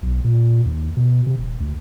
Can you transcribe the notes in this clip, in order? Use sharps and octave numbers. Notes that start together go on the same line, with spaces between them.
B1
A#2
D#2
B2
C3
D#1
D2